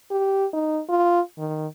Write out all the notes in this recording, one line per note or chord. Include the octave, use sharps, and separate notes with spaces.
G4
D#4
F4
D#3